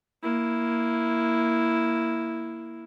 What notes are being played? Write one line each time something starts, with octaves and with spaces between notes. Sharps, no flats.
A#3 E4